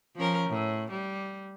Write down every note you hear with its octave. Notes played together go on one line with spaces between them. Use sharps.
F3 C#4 A#4
A2
G3